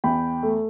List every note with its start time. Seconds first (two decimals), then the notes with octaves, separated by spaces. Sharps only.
0.04 E2 G5 B5
0.43 A3